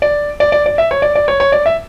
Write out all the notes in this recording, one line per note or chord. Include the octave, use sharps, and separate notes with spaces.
D5
D5
D5
D5
E5
C#5
D5
D5
C#5
C#5
D5
E5